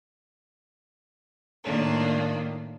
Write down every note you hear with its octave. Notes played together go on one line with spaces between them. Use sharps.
A2 D#3 A#3 D4 F4